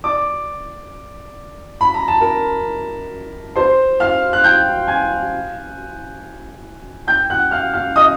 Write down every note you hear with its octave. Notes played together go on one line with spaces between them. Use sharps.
D5 D6
B5
A#5
A5
A#4 A#5
C5 C6
F5 F6
F#6
G5 G6
G#5 G#6
G5 G6
F#5 F#6
F5 F6
F5 F6
D#5 D#6